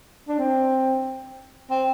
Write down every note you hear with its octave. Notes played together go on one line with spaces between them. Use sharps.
D4
C4
C4